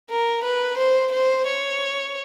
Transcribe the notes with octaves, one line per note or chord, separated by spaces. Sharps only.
A#4
B4
C5
C5
C#5